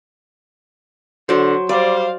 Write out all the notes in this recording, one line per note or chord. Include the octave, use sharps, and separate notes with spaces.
D3 F#3 C5
G3 C5 D5 F5